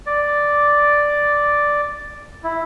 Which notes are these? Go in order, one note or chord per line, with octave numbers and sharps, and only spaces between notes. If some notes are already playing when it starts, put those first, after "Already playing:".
D5
E4